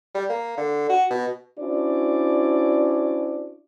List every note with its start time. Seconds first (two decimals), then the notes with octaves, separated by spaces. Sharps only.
0.15 G3
0.29 A#3
0.57 D3
0.89 F#4
1.10 B2
1.59 C#4 D4 E4 F#4 C5 D5